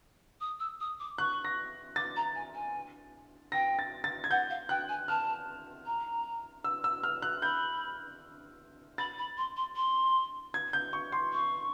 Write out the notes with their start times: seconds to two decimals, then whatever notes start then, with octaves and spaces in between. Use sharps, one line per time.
0.40 D#6
0.59 E6
0.80 D#6
0.99 D6
1.18 C#6 F#6
1.45 A#6
1.96 D6 A6
2.16 A#5
2.35 G#5
2.54 G#5
3.52 G5 A#6
3.79 A6
4.04 A6
4.24 G#6
4.31 F#5 G6
4.50 F5
4.69 G5 F#6
4.88 G#5
5.08 A5 F6
5.86 A#5
6.64 E6
6.84 E6
7.03 F6
7.22 F#6
7.42 B5 G6
8.98 B5 A6
9.18 B5
9.37 C6
9.56 C6
9.76 C6
10.54 G#6
10.73 G6
10.93 C#6
11.12 C6
11.32 C#6